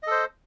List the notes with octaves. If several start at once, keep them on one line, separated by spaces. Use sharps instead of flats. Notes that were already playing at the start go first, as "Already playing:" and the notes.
A4 C5 D#5